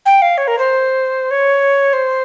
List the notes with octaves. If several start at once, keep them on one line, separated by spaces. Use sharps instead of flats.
G5
F5
C#5
A#4
C5
C#5
C5